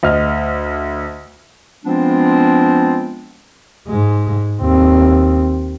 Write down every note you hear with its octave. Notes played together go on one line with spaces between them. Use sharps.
D2 D#5 F6
F3 G#3 B3 C4 D4 F4
G#2 G#3
D#2 C4